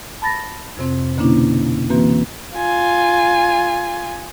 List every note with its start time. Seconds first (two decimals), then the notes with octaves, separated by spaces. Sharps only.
0.22 A5 B5 A6 A#6
0.77 F2 C3 C4
1.17 B2 D3 A#3 C#4 D4 E4
1.90 E3 A#3 C4 F#4 B4
2.55 F4 G#5